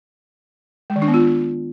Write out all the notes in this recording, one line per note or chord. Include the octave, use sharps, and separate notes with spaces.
G#3
D#3
D4
B3
F4